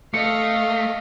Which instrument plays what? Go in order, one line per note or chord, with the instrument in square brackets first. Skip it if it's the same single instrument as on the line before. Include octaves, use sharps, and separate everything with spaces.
[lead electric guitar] A3 [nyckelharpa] D#5 F5 [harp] C#7